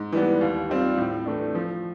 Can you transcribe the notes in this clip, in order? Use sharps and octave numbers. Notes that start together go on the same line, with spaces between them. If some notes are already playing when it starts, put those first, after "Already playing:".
Already playing: G#2
E3 G3 B3
D#2
D#3 G3 C4 F4
A2
E3 A3 D4
F3